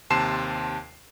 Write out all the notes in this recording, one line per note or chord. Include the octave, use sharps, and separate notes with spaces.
D#2 C3 A5 C6 C7 E7